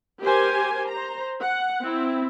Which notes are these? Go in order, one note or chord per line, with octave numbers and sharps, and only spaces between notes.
G4 A#4 C5 G#5
C5 A#5
F#5
C4 E4